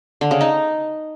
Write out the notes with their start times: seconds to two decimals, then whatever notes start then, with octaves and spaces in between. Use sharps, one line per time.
0.21 D3
0.31 C#3
0.41 D#4